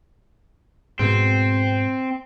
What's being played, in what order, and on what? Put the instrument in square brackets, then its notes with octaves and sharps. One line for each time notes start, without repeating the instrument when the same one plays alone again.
[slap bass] G#2 B2 [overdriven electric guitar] C4